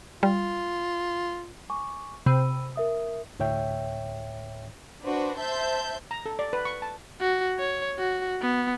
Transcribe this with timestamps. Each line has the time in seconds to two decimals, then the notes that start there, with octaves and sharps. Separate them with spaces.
0.23 G3 F4
1.70 G#5 C#6 D6
2.26 C3 B5 E6 D#7
2.76 A#4 E5 D#6
3.39 D2 A2 C#5 E5 G5
5.03 D4 F#4 B4 C5
5.38 C5 E5 A5 G6
6.11 A#5
6.26 A4
6.39 D5
6.53 B4
6.65 C#6
6.82 A5
7.21 F#4
7.59 C#5
7.99 F#4
8.42 B3